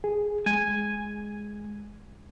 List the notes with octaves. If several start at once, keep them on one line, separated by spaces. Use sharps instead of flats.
G#4
G#3 G#5